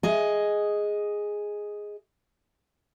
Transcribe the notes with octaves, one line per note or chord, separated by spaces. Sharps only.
G#4 D#5